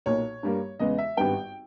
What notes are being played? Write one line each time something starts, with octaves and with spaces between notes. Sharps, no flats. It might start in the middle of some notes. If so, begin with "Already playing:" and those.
B1 A#2 A#3 C#5
G2 G3 A#3
E2 C#3 G#3 B3 D#5
E5
G#1 G2 G3 B3 G5